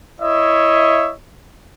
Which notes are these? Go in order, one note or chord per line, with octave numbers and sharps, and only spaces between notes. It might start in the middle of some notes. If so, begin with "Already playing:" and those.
E4 C#5 D#5 E5